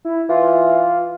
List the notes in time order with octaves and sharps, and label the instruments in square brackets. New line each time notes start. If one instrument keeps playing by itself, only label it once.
[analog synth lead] E4
[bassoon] E3 [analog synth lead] F4